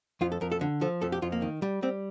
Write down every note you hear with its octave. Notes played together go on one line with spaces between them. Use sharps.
F2 F4
A4
F2 A#4
A4
D3
F3 A4
F2 A4
G4
F2 F4
A#3
D#3
G3
G3 C4